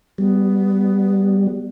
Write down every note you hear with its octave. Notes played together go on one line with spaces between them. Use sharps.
G3 B3